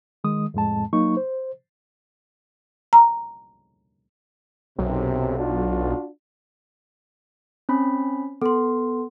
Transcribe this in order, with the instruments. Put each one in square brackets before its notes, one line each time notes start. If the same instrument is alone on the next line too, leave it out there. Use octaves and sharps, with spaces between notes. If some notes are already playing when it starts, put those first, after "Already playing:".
[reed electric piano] D#3 G#3 D#6
F2 A2 G#3 A5
F#3 A#3 D#4 C#6
C5
[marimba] A#5
[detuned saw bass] B1 [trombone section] F#2 C3
[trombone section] D4 F4 F#4
[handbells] C4 C#4 B5
[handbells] B3 [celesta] A4 C6